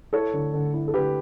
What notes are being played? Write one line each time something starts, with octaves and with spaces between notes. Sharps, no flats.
E4 A4 C#5
D3
D3
E4
A4
D3 G4 B4